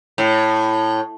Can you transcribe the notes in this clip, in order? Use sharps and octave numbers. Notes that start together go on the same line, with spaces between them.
A2